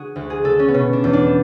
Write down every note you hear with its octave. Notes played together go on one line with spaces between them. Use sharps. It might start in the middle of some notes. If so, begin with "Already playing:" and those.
Already playing: D3 F#4 G#4
D2
G#4
D3 A4
C#4
B3
B2 C#4
D4
E2
D4